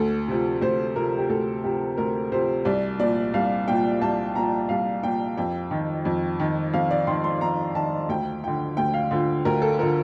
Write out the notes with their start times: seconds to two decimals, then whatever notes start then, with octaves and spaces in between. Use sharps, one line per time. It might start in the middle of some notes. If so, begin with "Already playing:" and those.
Already playing: D2 A4
0.28 C3 F3
0.61 D2 C5
0.96 C3 F3 A#4
1.18 G4
1.29 D2 A4
1.64 C3 F3 G4
1.97 D2 A#4
2.32 C3 F3 C5
2.65 C2 D5
2.99 A#2 F3 D5
3.34 C2 F5
3.68 A#2 F3 G5
4.01 C2 A5
4.35 A#2 F3 A#5
4.69 C2 F5
5.03 A#2 F3 G5
5.37 F2 G5
5.71 D#3
6.05 F2
6.40 D#3
6.73 F2 F5
6.91 D5
7.07 D#3 C6
7.24 C6
7.41 F2 A#5
7.75 D#3 A5
8.09 D2 G5
8.43 D3 F3 G5
8.77 D2 G5
8.94 F5
9.11 D3 F3
9.45 D2 A#4
9.62 A4
9.79 D3 F3 A#4